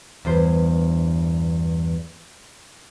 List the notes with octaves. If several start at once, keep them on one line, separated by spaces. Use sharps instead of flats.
E2 G2 C5